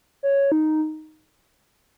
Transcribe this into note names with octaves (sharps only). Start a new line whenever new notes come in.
C#5
D#4